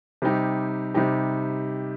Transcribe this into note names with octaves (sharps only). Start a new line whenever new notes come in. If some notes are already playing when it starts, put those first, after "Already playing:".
C3 G3 D#4 G4
C3 G3 D#4 G4